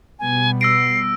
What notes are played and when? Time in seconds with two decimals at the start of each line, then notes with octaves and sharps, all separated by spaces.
0.19 B2 G3 B3 G#5
0.61 E6 A#6 C7 D7